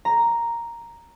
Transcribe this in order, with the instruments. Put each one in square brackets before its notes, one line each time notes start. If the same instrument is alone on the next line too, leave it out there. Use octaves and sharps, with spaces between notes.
[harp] A#5